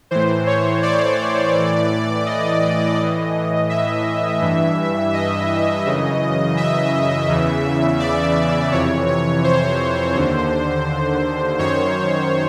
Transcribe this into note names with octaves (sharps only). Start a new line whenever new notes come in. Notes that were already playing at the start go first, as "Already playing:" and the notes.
A2 E3 C5
C#5
D5
A2 E3
D#5
A2 E3
E5
G2 E3
D#5
F#2 C#3 E3
E5
E2 C#3 E3
D5
F2 C3 E3 C#5
C#5
C5
D#2 D3
F#2 D#3 C#5